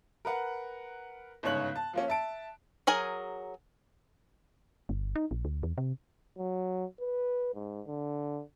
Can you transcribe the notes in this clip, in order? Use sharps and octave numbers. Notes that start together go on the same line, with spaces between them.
A#4 B4 F#5
G1 G#2 C#3 C#5 F#6 F#7
A5
F3 A#3 C#4
E5 A5 D7
F#3 G#4 A#4 G#5
G1
D#4
A#1
D2
E2
C3
F#3
B4
G#2
D3